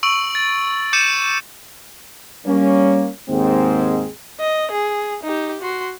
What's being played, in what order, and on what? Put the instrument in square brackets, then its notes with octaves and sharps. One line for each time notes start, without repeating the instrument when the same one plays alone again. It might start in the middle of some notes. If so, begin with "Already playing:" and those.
[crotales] C#6 E6 D7 F#7
A6
D6 G6 C#7 D#7 E7
[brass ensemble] G3 A#3 C#4
D#2 G#2 G#3 C4
[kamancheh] D#5
G#4
D#4 G4
F#4 C6